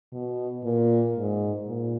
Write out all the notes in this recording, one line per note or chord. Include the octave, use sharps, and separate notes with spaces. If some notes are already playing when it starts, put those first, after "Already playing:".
B2
A#2
G#2
A#2